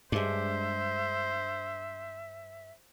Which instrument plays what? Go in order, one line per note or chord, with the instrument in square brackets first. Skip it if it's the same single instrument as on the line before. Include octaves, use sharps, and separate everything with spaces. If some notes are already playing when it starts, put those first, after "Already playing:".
[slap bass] G2 [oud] G#3 D4 [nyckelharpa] C5 [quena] E5